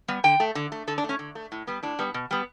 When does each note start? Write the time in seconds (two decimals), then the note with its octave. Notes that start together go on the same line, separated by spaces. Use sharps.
0.08 G3 B3
0.24 D3 G5
0.40 A3
0.55 D3
0.72 A3
0.87 D3 A4
0.98 D4
1.04 A3
1.09 C#4
1.19 D3
1.35 A3
1.52 A2
1.67 G3 B3
1.83 A2 D4
1.99 G3 B3
2.14 B2
2.31 G3 B3